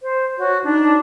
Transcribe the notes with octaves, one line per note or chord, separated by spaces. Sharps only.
C5
F#4 C#5
D4 D#4